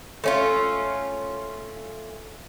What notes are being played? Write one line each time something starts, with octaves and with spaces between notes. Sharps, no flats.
A3 C#4 F4